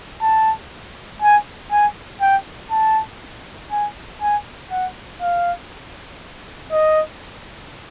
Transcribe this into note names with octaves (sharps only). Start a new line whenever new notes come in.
A5
G#5
G#5
G5
A5
G#5
G#5
F#5
F5
D#5